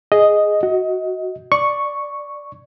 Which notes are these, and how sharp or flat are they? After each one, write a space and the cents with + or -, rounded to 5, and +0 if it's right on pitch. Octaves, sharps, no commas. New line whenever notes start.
G#4 +0 D#5 +0
F#4 +0 D#5 +25
D5 +0 C#6 +0